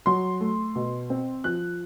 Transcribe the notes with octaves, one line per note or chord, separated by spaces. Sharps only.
F#3 C6
A3
B2
C4
F3 F#6